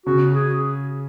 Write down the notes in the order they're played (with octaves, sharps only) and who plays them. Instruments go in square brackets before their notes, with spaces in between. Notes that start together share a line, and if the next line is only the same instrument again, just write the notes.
[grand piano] C#3 [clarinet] F#4
[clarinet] G#4